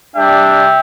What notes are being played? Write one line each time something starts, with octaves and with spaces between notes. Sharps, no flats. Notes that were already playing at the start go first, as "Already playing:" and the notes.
G3 D4 G4 E5 G5